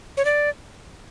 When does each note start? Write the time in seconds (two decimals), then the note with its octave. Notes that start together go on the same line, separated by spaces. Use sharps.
0.17 C#5
0.25 D5